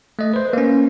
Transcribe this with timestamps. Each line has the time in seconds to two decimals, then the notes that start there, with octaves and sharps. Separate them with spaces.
0.19 A3 D#5
0.34 B4 C5
0.53 A#3 C#4